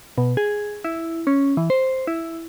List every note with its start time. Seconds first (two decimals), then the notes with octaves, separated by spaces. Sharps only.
0.18 B2
0.37 G#4
0.84 E4
1.27 C#4
1.57 E3
1.70 C5
2.07 E4